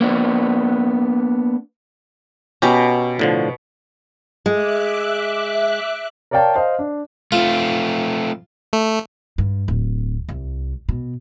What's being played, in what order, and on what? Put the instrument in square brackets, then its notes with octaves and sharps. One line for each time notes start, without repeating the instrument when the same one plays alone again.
[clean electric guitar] A#3 B3 D4
[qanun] B2 A#5 [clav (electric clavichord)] C#4 G4
[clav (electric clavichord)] A2 D3 F3
[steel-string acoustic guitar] G#3 [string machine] E5 D6 F#6
[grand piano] A#4 C#5 D5 F5 G5 A5
C5 D#5 F5
D4
[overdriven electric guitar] A3 C4 [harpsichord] F4
[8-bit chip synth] A3
[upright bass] G2
D1
C2
B2